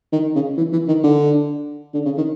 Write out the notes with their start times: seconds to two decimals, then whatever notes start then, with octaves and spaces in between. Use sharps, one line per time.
0.13 D#3
0.35 C#3
0.57 E3
0.72 E3
0.88 D#3
1.03 D3
1.94 D3
2.05 C#3
2.17 D#3